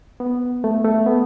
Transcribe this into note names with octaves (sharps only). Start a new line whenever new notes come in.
B3
A3
A3
B3